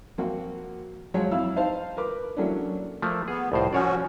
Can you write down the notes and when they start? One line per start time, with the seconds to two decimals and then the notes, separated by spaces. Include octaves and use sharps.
0.18 F3 A#3 C4 F#4
1.14 F3 F#3 G#3 C#5
1.31 F2 E4 F5 E6
1.56 D#4 C5 F5 A5
1.97 A#4 B4 D6
2.37 E3 F#3 A3 A#3 C#4 D4
3.02 F3 A3 A#3
3.28 B3 G#4
3.52 C2 A2 F3 C5
3.73 F3 C#4 F#4 C#5 D5